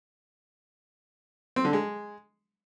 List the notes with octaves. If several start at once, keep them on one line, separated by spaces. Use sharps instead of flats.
C4
D3
G#3